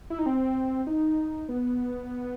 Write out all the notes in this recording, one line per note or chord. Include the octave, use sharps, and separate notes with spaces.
E4
D#4
C4
D#4
B3